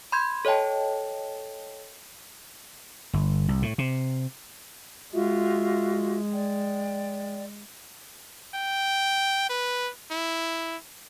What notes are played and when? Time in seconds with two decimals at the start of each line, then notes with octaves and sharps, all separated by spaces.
0.12 B5 C6 G6 G#6
0.45 A4 C#5 D#5 G5 A5
3.13 G1
3.48 C2
3.62 A2
3.78 C3
5.13 G#3 F4 F#4 E5
6.32 D5 G5
8.55 G5
9.50 B4
10.11 E4